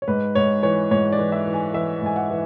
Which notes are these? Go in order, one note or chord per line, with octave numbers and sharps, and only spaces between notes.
C#5
G#2 B4
G#2 C#5
E3 C#5
G#2 C#5
D5
E3
E5
E3
G#5
E3 E5
G#2 G#5
F#5
E3